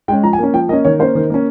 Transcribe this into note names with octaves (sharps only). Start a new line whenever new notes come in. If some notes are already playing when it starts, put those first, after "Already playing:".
G#3 C#4 G5
F3 A#5
G#5
A#3 C#4
F3 G5
A#3 C#4 D#5
D#3 C#5
A#3 C#4 C5
D#3
A#3 C#4